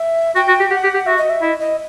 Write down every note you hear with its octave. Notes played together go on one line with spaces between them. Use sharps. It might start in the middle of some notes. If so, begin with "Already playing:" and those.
Already playing: E5
F#4 G5
F#4
G4
G4 F#5
G4
G4
F#4 E5
D#5
E5
E4 D#5
D#5